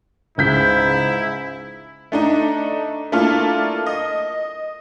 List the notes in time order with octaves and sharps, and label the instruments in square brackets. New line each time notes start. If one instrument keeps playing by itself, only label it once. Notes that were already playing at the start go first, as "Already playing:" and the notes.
[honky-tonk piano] C#2 G6 B6 [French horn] G#2 [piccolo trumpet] E4
[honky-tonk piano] A3 D4 D#4
A3 A#3 D4 E4 F4 A4
D#5